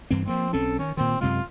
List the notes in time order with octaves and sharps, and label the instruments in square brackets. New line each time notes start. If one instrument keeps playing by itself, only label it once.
[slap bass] G2 E3 C4
[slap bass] F3 A#3 [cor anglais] C4
[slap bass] B1 C4 C#4 [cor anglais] A4
[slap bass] D#3 [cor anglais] C#4
[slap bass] A#2 D#3 [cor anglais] C4
[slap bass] F#2 C3 G#3 [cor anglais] F4